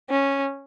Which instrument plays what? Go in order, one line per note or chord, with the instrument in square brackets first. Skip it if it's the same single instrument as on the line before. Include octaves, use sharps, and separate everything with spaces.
[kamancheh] C#4